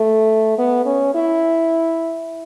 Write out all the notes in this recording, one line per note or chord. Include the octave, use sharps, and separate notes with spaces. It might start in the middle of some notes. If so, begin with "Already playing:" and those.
Already playing: A3
B3
C#4
E4